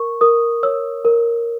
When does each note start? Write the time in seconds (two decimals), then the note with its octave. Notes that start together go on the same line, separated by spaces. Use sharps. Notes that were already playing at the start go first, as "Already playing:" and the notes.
Already playing: A#4 C#6
0.21 A#4 D#6
0.63 C#5 E6
1.05 A#4